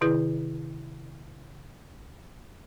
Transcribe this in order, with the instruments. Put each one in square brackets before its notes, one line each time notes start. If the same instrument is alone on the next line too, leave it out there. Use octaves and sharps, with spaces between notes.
[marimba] C3 D#3 E4 G#4 B4